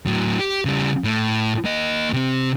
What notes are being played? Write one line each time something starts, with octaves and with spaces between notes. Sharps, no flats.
A2 F#3
G4
C#3 G3
A2
A#3 D#5
C3 C4